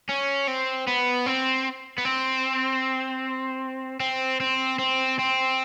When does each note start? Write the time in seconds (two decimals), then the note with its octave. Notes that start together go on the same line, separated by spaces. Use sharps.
0.09 C#4
0.48 C4
0.87 B3
1.26 C4
1.98 B3
2.05 C4
4.00 C4
4.40 C4
4.79 C4
5.19 C4